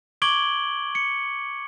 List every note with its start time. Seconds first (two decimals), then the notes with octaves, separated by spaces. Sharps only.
0.22 C#6 D6 G#6 D7 F#7 G7
0.95 C#7